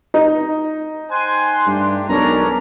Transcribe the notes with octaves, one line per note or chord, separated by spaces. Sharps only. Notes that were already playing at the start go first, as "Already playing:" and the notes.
D#4
C5 G5 G#5 C6 F#6
G2 A3 D4 G4
B1 G#3 C#4 D4 A4 A#4 A#5